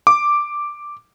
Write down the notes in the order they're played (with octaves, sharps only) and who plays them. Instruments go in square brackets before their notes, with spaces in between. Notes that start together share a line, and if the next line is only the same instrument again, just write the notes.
[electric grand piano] D6